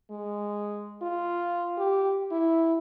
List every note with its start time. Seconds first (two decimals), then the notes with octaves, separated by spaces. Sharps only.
0.11 G#3
1.02 F4
1.78 G4
2.31 E4